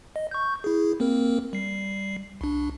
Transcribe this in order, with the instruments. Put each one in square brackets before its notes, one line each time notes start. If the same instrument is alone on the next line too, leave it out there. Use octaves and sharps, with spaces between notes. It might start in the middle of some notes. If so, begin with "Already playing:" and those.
[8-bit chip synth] D#5
C#6 G6
E4 G#4
A#3 C4 A#4
G3 C7
C2 D4